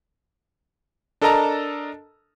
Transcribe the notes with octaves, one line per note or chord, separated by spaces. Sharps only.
D4 A4 A#4 D#5 A5 A#5